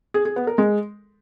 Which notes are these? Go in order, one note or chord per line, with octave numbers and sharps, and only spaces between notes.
G#4
G#4
B3
A#4
G#3